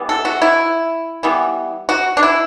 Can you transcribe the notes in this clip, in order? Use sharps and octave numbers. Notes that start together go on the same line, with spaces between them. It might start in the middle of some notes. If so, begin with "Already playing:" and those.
Already playing: E3 G3 B3
A4
F#4
E4
E3 G3 B3
F#4
D4
E4